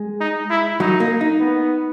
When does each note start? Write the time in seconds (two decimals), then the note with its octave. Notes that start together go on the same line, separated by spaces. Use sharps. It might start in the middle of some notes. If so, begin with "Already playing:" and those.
Already playing: G#3
0.20 D#4
0.50 E4
0.80 F#3 D#4
1.00 A#3
1.21 D#4
1.40 B3